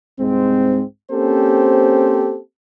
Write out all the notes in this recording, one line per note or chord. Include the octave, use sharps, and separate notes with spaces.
C2 G#2 G#3 C4
A#3 C4 C#4 G4 A4 C5